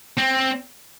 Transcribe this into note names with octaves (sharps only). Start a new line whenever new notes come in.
C4